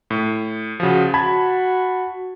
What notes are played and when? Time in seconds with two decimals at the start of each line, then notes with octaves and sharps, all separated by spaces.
0.10 A2
0.80 C#3 F3 F#4
1.14 F#4 A5 B5 G#6